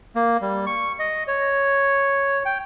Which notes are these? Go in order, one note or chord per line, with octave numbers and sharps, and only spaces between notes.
A#3
G3
C#6
D#5
C#5
G5